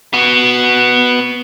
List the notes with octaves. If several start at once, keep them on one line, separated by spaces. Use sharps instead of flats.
B3 F#4